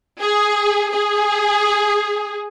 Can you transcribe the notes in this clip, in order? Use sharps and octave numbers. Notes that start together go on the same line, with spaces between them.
G#4
G#4